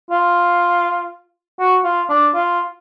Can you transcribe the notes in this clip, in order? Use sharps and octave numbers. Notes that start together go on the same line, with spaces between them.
F4
F#4
F4
D4
F4